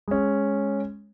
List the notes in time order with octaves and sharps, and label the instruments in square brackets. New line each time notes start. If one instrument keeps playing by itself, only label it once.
[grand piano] G#3 C#4